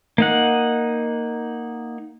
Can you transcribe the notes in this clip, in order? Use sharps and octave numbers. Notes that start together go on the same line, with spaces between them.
A#3 D#4 F#5